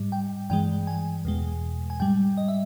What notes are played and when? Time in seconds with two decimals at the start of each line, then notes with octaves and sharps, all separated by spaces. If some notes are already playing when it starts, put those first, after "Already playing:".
Already playing: G#2 G3
0.12 G5
0.50 G2 E3 G#3 G5
0.87 G#5
1.25 E2 B2 G#3
1.90 G#5
2.00 G#2 G3 G5
2.38 D#5
2.48 E5